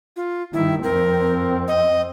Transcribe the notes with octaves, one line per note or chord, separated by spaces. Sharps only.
F4
G2 D#3 E4
F2 C4 A#4
D#5